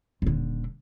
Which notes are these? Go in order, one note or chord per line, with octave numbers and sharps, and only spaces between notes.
D#1 D3